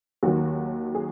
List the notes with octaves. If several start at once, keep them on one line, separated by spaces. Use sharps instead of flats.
D#2 D#3 F#3 F#4
G#4